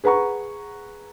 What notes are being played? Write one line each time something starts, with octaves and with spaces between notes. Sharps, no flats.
G#4 B4 F#5 A#5 C#6